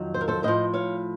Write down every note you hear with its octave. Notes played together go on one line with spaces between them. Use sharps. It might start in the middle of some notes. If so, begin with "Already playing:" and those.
Already playing: F2 D#3 F#3
C5
A#4
A4 C5
A2 F3 C5 D#5
C#5 F5